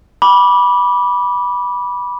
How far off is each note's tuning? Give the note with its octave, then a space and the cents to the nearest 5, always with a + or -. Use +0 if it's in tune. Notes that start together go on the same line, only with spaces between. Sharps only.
B5 -15 D6 -10